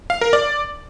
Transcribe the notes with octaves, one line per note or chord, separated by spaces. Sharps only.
F5
A#4
D5